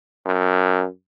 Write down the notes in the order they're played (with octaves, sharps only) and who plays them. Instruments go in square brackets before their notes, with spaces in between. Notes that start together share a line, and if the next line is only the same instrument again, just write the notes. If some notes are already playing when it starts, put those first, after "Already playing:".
[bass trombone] F#2